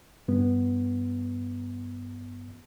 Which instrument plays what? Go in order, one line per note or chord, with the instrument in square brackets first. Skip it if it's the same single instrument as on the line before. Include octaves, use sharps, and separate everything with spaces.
[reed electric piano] G2 B3